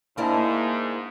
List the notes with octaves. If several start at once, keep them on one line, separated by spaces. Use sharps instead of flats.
G#2 A#3 D4 E4